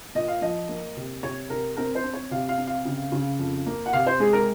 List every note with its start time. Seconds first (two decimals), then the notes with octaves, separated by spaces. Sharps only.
0.15 A#2 D#5
0.28 F5
0.42 F3 D#5
0.69 A#3
0.97 C3
1.23 C3 C#5
1.50 C3 A#4
1.77 C4 A#4
1.95 C5
2.04 C4
2.13 C#5
2.31 C3 F5
2.49 F5
2.58 C4
2.67 F5
2.85 C#3
3.12 C#3
3.39 F2
3.66 A#3
3.86 F#5
3.93 C3 F5
4.07 C5
4.20 G#3 G#4
4.33 A#4